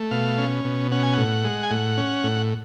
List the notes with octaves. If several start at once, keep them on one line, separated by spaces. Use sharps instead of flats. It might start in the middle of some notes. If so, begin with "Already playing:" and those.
Already playing: A3
B2 F5
C#4
B2
C#4 F#5
G#5
A2 F#5
G#3
G#5
A2 F#5
C#4
A2